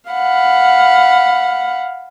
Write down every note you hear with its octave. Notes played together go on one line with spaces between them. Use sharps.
F5 F#5 B5